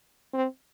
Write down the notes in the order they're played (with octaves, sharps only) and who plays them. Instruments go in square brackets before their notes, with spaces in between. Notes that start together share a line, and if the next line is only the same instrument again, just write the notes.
[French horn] C4